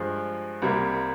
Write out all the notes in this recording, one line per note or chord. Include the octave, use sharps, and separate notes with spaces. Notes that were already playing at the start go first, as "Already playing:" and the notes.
Already playing: G2 F3 G#3
C2 C3 G3 A#3